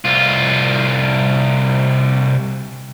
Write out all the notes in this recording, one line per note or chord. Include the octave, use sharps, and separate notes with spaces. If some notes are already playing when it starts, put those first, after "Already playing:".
C2 F4